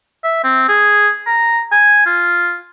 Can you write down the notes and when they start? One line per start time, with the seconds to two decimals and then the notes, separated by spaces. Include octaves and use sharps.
0.24 E5
0.44 C4
0.68 G#4
1.27 A#5
1.72 G#5
2.06 F4